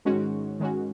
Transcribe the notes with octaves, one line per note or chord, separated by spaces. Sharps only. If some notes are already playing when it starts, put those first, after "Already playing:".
G#2 D#3 G#3 C#4 F#4
D#3 G#3 C#4 F#4